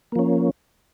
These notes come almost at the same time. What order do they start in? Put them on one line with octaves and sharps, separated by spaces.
A#3 F3 C#4